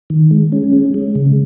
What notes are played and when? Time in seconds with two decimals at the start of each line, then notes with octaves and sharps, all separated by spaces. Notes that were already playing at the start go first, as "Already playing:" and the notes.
0.10 D#3
0.31 G#3
0.52 C#4
0.73 G#3
0.94 G#3
1.15 C#3